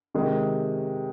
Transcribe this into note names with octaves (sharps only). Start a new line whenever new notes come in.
C3 D#3 G#3